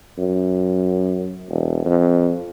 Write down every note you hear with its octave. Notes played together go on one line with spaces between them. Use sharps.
F#2
E1
F2